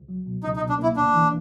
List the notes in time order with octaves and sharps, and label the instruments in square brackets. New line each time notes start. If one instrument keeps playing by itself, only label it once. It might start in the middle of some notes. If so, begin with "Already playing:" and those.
Already playing: [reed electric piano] C#2
F#3
B2
[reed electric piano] C#2 [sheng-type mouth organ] D#4
[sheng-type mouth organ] D#4
[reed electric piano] B2
[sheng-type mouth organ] D4
[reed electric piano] A#3 [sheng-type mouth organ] E4
[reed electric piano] D2 [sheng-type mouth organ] D4
[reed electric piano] E3